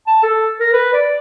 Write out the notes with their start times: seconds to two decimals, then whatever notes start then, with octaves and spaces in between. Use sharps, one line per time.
0.07 A5
0.23 A4
0.60 A#4
0.73 B4
0.93 D5